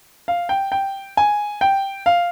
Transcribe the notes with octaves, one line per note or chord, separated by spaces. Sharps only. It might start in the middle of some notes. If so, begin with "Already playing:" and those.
F5
G5
G5
G#5
G5
F5